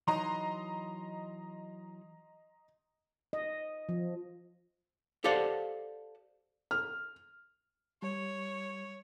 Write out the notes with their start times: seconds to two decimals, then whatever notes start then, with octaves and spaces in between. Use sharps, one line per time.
0.08 E3 F#3 D#4 D#5 A#5 C6
3.33 D#5
3.89 F3
5.24 G4 A4 C5 D5 F5 F#5
6.71 F6
8.02 G3 C#5